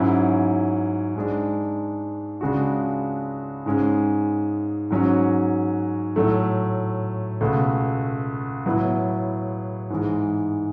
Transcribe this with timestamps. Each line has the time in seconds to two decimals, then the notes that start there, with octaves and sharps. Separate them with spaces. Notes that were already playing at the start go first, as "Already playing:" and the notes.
Already playing: G#2 F#3 C#4 E4
1.16 G#2 G#3 D4
2.41 C#2 C#3 G#3 D4 F#4
3.66 G#2 G#3 C#4
4.90 G#2 F#3 C#4 F#4
6.16 A2 F#3 A3
7.41 C#2 B2 A3
8.66 A2 F#3 B3 E4
9.90 G#2 E3 G#3